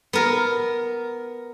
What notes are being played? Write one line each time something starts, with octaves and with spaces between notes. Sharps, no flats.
B3 A#4